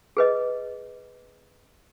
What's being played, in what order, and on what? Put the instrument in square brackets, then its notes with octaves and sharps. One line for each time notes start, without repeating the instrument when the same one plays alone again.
[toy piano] G#4 B4 D#5